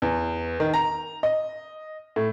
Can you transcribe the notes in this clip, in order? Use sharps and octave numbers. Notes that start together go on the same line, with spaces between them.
E2
D#3
A#5
D#5
A2